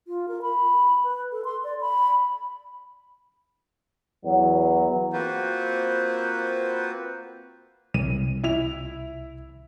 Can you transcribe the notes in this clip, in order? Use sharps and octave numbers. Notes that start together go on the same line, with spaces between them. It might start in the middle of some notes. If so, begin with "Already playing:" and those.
F4
A#4
B5
B4
A4
C6
D5
B5
E2 F#3
A#3 C4 F4 F#4 B4 C5
C2 D#7
E4 F7